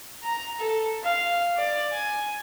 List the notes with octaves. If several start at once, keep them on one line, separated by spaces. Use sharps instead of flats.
A#5
A4
F5
D5
G#5